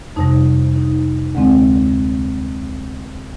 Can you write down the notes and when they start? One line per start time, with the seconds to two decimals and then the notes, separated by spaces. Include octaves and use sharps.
0.16 F2 C3 G3 D#4
0.76 D#4
1.35 D2 D3 G#3 C4